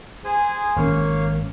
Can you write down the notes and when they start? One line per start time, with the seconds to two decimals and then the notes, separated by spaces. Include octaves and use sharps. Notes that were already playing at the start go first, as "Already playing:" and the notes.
0.24 G#4 C5 G#5
0.76 G#1 A#3 C#4 C#5 F5